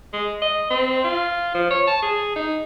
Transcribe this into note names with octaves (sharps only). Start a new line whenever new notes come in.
G#3
D#5
C4
F4
F3
C#5
A5
G#4
D#4